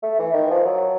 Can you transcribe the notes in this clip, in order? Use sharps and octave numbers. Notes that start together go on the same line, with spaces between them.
A3
E3
D#3
F3
F#3